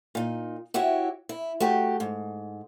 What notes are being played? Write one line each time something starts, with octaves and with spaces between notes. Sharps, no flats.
A#2 D#4
E4 F#4 G4 C#5 E5
E4
A3 F#4 G4
G#2